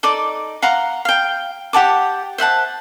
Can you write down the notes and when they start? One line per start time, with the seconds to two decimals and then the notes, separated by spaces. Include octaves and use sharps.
0.03 D#4 A4 D5 D6
0.62 F5 F#5 A#5 C6
1.05 F5 G5
1.73 G4 F#5 A5 D6
2.38 C5 E5 F#5 A5